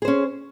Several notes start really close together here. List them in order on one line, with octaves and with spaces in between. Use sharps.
G#4 C5 C#4